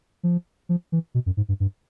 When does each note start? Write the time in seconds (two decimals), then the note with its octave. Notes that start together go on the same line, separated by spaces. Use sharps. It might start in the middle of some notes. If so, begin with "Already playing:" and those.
0.23 F3
0.69 F3
0.92 E3
1.14 B2
1.26 F#2
1.37 G#2
1.49 G2
1.60 G2